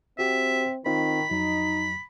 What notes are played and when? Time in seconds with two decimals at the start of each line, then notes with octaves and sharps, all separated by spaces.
0.19 C4 F#4 G4 E5
0.86 D#3 C4 D#4 F4 B5
1.31 F2 F#3 D#4